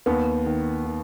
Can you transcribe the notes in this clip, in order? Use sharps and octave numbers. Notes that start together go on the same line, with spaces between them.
D#2 B3
D#3
D#3